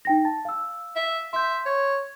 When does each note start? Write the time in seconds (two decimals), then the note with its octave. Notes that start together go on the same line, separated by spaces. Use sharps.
0.05 D#4 G5 A#6
0.25 A5 A6
0.45 F5 E6
0.96 E5
1.33 E5 C6 G6
1.66 C#5